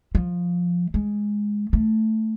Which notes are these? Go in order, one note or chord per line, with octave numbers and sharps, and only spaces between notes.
F3
G#3
A3